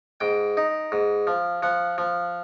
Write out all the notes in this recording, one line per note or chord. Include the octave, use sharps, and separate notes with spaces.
G#2 G5
D#4
G#2
F3
F3 F#5
F3